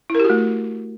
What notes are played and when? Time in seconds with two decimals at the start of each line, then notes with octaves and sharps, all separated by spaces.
0.10 E4
0.15 A#4
0.20 G4
0.25 F#4
0.30 A3